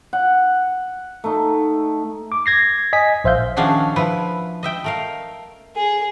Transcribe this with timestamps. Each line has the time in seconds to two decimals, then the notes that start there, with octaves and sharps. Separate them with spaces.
0.13 F#5
1.24 A3 D#4
2.32 D6
2.46 G#6 A#6 C7
2.93 D#5 G#5 B6
3.24 A#1 C5 E5 F5 G6
3.57 D#3 F3 C#4 D4 F#4 G#4
3.96 F3 E4 B4
4.63 D#5 E5 G5
4.84 A3 A#4 F5
5.76 G#4